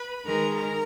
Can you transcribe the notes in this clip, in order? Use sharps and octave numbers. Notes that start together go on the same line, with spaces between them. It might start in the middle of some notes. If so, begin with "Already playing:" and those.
Already playing: B4 B5
D#3 G#3 A#4 A#5
A#4 A#5